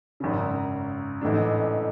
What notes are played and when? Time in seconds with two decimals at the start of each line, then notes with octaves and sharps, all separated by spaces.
0.20 G#1 F#2 C#3
1.21 A1 G#2 E3 A3 D4